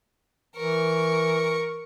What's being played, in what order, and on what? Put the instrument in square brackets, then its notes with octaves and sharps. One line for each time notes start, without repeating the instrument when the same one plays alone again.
[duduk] E3 [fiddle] A#4 C#6